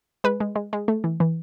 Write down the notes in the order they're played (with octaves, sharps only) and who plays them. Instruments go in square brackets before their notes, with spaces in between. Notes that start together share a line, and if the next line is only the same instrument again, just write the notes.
[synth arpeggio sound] G#3 B4
G#3
G#3
G#3
A3
E3
E3